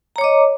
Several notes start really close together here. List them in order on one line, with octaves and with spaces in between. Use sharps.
A#5 C#5 D6 D#5